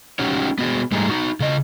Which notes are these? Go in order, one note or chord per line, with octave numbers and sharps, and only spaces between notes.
C#4 D#4 F#4 G4 C#5
B3 F#4 G#4
G#2 G3 A3 D#4 G#4 A#5
D#4 F#4
C#3 D#5